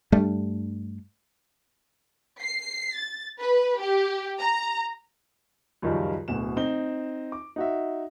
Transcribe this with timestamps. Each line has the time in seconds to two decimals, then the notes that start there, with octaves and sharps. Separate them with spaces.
0.12 G2 G3 A3 D4
2.41 C7
2.95 A6
3.40 B4
3.81 G4
4.40 A#5
5.82 C#2 F#2 D#3 F3 G3
6.28 D1 D2 B2 E7
6.57 C4 D#4 G7
7.32 D6
7.56 D#4 F#4 E5